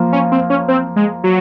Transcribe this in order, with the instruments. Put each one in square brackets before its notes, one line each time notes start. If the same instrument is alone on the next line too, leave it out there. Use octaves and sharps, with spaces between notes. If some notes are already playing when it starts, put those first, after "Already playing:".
Already playing: [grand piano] F3 A#3 F4
[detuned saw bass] C#4
C4
C#4
C4
G#3
F#3